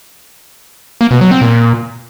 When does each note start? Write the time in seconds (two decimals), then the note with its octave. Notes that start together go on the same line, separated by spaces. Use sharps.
1.01 A#3
1.11 B2
1.21 F#3
1.31 C4
1.41 A#2